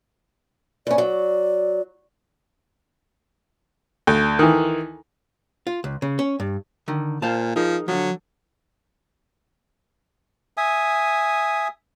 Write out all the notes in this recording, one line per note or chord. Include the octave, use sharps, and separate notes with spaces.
G2 C#4 D5
F#3
D2
D#3 E3
F4
C#2
C#3
C#4
G2
D3 D#3
A#2 C5 F5 A5
F3 D#4 G#4 A#4
D3 F3 F#3
E5 G#5 D#6